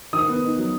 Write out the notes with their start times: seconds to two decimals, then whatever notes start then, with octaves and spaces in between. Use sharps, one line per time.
0.13 D#3 D#6
0.28 B3
0.42 D#4
0.58 F#3